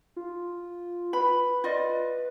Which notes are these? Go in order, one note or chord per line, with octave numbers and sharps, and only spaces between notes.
F4
B4 B5
F4 D5 D#5